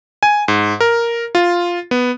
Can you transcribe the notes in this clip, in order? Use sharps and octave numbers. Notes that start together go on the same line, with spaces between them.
G#5
G#2
A#4
F4
B3